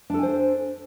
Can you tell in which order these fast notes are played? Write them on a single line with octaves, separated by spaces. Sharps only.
D4 A4 G#5 C5